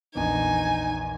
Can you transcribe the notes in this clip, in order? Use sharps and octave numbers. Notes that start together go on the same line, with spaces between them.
A#1 E2 D#4 G#5